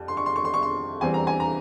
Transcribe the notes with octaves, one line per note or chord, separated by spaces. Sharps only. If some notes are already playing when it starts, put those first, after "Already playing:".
Already playing: F2 G3
C6
C#6
C6
C#6
C6
C#6
C6
E2 E3 G3 C4 G#5
A#5
G#5
A#5